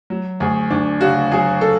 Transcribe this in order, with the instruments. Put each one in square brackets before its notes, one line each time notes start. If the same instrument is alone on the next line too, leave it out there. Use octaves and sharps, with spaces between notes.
[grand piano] F#3
D2 G#4
D2 D4
C#3 F#4
F#3 G#4
A4